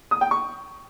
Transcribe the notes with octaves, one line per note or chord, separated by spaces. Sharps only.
D#6
G5
C#6